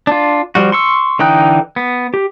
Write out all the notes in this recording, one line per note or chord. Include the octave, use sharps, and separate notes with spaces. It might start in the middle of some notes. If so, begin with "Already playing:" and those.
D4 F4
F3 G3 F#4
C6 C#6 E6
D3 E3 D#4 G5 F#6
B3
G4